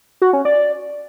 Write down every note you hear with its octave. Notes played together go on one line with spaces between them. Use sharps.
F#4
C#4
D5